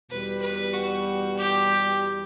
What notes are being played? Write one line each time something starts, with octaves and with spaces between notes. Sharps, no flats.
E2 B2 G3 B4
B4
F#4
G4